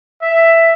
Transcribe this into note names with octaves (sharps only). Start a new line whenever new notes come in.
E5